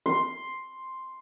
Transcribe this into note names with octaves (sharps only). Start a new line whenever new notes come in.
C6